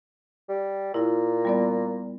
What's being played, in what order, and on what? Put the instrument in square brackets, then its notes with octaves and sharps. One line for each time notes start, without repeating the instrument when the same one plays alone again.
[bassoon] G3
[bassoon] A#2 [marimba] E4 F4
[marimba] G3 B3 D5